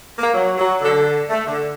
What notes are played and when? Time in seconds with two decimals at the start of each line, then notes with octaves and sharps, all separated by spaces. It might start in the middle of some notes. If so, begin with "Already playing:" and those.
0.19 A#3
0.34 F#3
0.58 F#3
0.81 D3
1.30 A3
1.48 D3